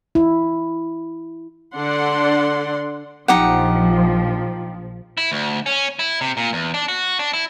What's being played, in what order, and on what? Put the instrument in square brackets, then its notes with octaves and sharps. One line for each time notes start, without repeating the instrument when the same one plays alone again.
[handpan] E4
[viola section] D3 D5 F#5 C6
[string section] A#1 F3 [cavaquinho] D#4 G4 F#5
[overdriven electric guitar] E4
D2
C#4
E4
C3
A#2
E2
D4
F#4
D4
E4